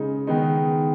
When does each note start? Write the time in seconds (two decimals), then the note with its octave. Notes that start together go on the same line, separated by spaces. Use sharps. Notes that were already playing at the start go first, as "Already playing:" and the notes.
Already playing: C#3 G#3 D#4
0.27 D#3 G#3 B3 D#4